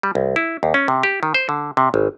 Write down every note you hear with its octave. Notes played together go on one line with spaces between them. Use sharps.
G3
C2
E4
D#2
C#4
C3
G4
D#3
C5
D3
C3
G#1